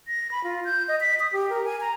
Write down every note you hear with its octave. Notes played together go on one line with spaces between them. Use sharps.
A#6
B5
F4
G6
D#5
B6
D#6
G4
A#4
G#5
A#5